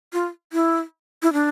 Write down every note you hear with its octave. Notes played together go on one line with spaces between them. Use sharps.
F4
E4
E4
D4